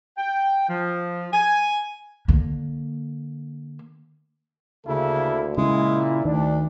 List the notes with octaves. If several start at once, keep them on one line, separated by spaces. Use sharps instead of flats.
G5
F3
G#5
D3 A#3
D2 C#3 A#3 E4 A4
A#2 C#3 G#3 E4
D2 D#3 D4